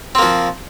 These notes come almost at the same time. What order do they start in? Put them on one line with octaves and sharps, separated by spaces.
C4 A#3 F3